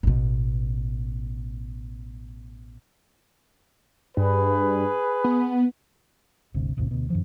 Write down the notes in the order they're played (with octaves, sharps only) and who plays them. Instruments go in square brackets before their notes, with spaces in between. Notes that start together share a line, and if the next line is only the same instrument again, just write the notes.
[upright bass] A1 B2
[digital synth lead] G2 [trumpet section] G#4 B4
[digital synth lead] B3
[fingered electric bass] G1 D2 C3
D1 A1 E2 C3
D2 B2
F#2 D#3 F3